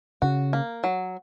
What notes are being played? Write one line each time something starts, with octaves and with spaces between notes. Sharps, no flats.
C#3 F#4
A#3
F#3